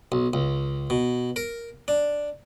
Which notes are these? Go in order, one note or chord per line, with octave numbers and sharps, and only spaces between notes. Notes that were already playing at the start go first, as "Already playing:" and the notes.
B1
C#2
B2
A#4
D4